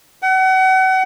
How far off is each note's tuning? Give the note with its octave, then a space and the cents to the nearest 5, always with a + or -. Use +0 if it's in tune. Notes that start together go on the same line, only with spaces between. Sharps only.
F#5 +35